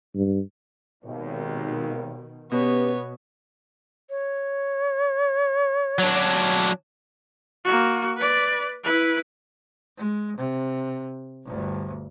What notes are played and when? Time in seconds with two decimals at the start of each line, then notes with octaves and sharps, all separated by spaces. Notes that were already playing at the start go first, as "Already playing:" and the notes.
0.15 G2
1.04 G#1 D#2 B2 D#3
2.52 B2 B3 C#4 G4 B4 C#5
4.10 C#5
5.98 F#3 D4
7.65 A#3 F#4
8.17 B4 D5
8.84 E4 B4
9.98 G#3
10.37 C3
11.46 G1 D2